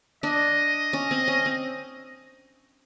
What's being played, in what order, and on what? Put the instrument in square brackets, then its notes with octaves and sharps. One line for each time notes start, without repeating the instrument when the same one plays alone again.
[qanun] D4 [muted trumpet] D#5
[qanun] C#4
C4
C#4
C4